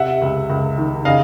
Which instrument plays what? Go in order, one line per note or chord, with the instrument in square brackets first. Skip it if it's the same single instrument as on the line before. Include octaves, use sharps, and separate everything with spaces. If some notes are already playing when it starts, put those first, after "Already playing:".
Already playing: [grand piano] C3 E5 F#5
C#2
C#2
D#3
C#3 D#5 F5